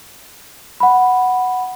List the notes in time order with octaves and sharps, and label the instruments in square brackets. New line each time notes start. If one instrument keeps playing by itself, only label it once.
[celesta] F#5 B5